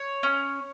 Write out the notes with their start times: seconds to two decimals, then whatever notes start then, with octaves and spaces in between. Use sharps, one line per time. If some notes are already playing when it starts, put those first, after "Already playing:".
Already playing: C#5
0.23 C#4